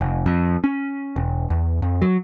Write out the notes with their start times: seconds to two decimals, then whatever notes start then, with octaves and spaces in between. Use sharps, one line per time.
0.01 F1
0.26 F2
0.64 C#4
1.16 E1
1.50 E2
1.82 F2
2.02 F#3